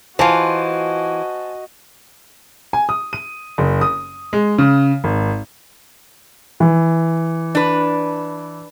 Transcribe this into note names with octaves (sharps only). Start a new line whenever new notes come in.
E3 F4 F#4 C5 D#5 G#5 A5
G#5
D#6
D#7
F#1
D#6
G#3
C#3
G#1
E3
D4 B4